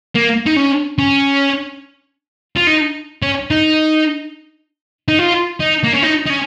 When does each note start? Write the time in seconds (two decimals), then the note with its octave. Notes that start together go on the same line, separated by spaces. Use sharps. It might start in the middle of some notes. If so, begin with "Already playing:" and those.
0.15 A#3
0.46 D#4
0.56 C#4
0.99 C#4
2.56 F4
2.67 D#4
3.22 C#4
3.50 D#4
5.08 D#4
5.19 F4
5.60 D#4
5.83 A#3
5.93 C#4
6.02 D#4
6.26 D#4
6.30 C#4